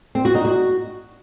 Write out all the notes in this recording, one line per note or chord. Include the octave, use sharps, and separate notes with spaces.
C4
F#4
D#4
F#4